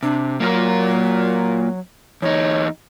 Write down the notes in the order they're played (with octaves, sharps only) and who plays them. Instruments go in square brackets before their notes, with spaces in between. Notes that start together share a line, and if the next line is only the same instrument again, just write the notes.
[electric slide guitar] C3 [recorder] D4
[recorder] F#3 [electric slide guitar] A#3 F4 A#4
[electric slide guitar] E2 D#4 [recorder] C#5